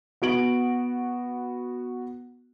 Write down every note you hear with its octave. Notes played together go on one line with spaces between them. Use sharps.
B3 F#4 D7 F#7